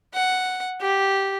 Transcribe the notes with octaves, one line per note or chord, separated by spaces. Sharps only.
F#5
G4